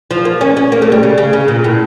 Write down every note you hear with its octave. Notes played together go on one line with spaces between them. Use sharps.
F3
A#3
C#4
C#4
A#3
A3
G3
C#3
C#3
C#3
A#2
A2